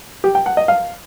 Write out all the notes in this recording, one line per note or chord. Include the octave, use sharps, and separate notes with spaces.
G4
G5
F#5
D#5
F5